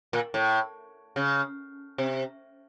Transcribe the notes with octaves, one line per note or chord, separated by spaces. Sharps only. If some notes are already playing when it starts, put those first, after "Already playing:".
A#2
A2
C#3
C3